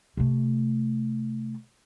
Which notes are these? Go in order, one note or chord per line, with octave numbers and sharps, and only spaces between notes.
C3 A3